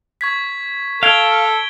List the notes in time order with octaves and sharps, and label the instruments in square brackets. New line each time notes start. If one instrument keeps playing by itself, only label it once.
[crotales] C#6 G#6 B6
[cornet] A4 [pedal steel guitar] F5 [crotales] G#6 D7 G7